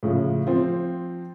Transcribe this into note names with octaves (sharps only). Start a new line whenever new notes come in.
A2 C#3 F3
F3 C4